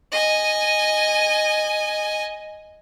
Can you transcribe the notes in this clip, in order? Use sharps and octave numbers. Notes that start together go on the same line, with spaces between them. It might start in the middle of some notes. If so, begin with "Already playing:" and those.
D#5 G#5